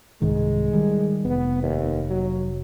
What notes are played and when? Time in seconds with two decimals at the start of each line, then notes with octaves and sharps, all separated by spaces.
0.22 C2 G#2 D#3 G#3
0.73 D#3 G3
1.25 F1 B3
1.63 D#2
2.09 F#3